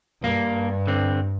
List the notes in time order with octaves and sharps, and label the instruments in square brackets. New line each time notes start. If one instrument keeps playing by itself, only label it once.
[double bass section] G2 [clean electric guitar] A#3
[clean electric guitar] D3 C4